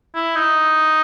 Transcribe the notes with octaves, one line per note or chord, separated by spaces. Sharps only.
E4
D#4